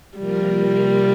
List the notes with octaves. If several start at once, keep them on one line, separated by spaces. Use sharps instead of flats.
C3 F3 G3 A#3 F4 A#4